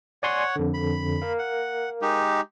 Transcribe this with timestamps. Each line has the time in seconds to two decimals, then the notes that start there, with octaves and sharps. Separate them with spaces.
0.23 C#5 D5 F#5 G#5 C6
0.56 F2 D3
0.74 B5
1.22 A#4 F5
1.39 F#5
2.02 G#3 D#4 G4